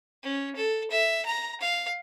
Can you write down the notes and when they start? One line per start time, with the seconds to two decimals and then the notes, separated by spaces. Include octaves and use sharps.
0.23 C#4
0.56 A4
0.91 E5
1.26 A#5
1.61 F5